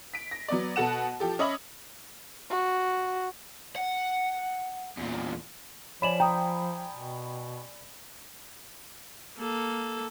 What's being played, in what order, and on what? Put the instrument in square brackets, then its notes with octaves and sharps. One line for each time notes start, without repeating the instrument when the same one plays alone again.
[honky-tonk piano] B6 D7
A#6
F#3 B3 D5
B2 F#4 A4 F#5 E7
F3 G4 A4
C#4 D#5 E5 B5 D6 F#7
[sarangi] F#4
[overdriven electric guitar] F#5
E2 A#2
[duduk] F3 [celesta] C#5 E7 F#7 [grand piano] D5 G#5 B5
[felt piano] G5 [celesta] A#5 D#6
[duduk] B2
[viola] A#3 A4